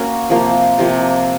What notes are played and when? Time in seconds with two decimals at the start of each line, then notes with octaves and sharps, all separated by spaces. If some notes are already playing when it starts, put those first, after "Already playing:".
Already playing: A#3 C#4 F#4
0.29 C3 F3 A#3
0.79 C3 F3 A#3